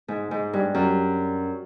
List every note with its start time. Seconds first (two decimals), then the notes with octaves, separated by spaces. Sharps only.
0.08 G#2
0.31 G#2
0.53 G2
0.74 F#2